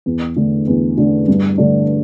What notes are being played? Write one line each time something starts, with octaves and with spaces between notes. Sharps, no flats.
E2
D3 A3 D4
E2
D3 A3 D4
G2
D3 A3 D4